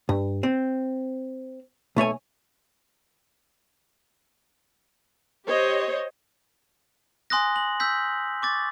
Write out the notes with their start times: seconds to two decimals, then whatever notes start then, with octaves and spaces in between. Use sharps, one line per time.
0.09 G2
0.43 C4
1.96 B1 A3 C#5 G#5
5.46 G4 C5 C#5 D#5
7.30 G#5 C6 D#6 F#6 A#6
7.56 F#7
7.80 E6 G6 B6
8.42 C#6 D6 A6